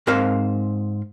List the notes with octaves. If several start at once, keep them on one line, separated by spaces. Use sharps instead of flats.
G#2 C4 A#4 C5 F5